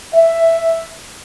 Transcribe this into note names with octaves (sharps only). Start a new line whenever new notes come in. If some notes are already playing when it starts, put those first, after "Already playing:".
E5